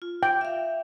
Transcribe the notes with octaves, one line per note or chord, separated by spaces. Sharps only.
F4
G5
E5 F5